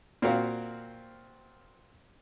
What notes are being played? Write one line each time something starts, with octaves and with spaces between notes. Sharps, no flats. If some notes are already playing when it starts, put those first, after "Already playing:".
A#2 C4 F#4 A#4 F5